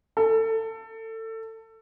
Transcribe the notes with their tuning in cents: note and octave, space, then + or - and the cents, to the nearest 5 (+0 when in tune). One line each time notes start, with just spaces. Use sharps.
A4 +25